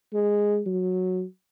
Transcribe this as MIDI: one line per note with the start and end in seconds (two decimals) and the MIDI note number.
0.13 0.60 56
0.66 1.23 54